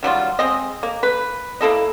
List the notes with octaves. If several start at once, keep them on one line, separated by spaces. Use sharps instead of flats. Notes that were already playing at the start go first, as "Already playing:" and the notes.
D#3 F#3 G3 F4
G#3 C4 D#5
A#3
B4
A#3 E4 A4 D#5